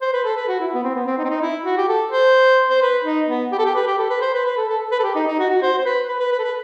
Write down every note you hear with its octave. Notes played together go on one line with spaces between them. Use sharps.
C5
B4
A4
B4
F#4
E4
B3
C4
B3
C4
D#4
C4
D#4
E4
F#4
G4
A4
C5
C5
B4
D#4
B3
G4
A4
G4
B4
G4
A4
B4
C5
B4
B4
A4
A4
B4
A4
G4
D#4
D#4
F#4
F#4
C5
C5
B4
B4
B4
B4
A4
B4